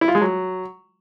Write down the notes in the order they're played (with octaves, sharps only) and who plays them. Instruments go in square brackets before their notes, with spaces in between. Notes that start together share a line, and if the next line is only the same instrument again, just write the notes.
[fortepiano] E4
F4
G#3
F#3